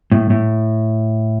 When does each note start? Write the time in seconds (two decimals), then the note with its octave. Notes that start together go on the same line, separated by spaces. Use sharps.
0.12 A2
0.30 A2